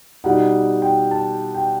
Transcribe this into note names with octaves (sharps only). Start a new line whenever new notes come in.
B2 G3 D#4 F#5
G5
A5
G5